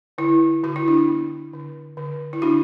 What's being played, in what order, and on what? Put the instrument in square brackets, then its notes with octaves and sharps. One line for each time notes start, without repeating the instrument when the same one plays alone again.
[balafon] D3 E4
D3 F#4
E4
D4 F#4
B3
D3
D3
E4
D3 D4 F#4